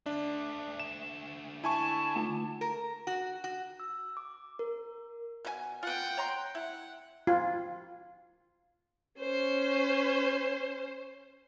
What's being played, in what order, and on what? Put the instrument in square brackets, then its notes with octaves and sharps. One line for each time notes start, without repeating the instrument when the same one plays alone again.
[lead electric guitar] D3 E5 [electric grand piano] D4
[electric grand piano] E7
[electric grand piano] E4 G#5 C#6 [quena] A5
[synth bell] A3 F4
[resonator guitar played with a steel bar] A#4
F#4
F#4
[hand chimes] E6
D6
A#4
[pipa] B2 E4 G#5
[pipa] F4 B4 [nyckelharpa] F#5 G5
[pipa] C#5 A#5 C6
[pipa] E4 [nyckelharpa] F#5
[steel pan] F4
[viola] C#4 C5